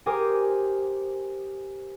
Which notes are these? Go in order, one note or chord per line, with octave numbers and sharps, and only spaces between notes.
G4 A#4 C5 G#5 D6 D#6